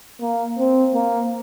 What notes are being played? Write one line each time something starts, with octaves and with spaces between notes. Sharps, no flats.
A#3
C4
A#3